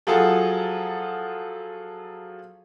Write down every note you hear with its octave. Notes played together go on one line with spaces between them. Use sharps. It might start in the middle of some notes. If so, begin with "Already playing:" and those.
F3 F#3 F4 F#4 G#4 A4